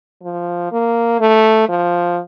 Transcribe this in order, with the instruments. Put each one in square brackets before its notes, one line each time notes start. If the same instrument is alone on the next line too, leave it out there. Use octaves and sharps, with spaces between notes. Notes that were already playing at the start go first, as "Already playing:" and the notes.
[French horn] F3
A#3
A3
F3